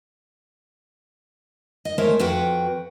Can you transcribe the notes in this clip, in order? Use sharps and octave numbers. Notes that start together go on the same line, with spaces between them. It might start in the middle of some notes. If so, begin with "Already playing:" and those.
D#5
G#3 A3 A#4 C5 C#5 E5
F2 F#4 B4 F#5 G5